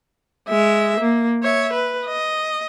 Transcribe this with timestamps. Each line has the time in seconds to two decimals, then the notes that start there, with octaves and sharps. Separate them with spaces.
0.49 G#3 E5
1.00 A#3
1.43 C#5 E5
1.73 B4
2.06 D#5